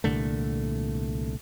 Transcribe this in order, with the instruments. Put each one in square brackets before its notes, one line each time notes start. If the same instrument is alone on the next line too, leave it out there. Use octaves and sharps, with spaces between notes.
[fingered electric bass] C2 A#2 D3 A3